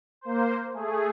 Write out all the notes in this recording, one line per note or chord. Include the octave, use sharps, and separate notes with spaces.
A#3 C5
A3 G#4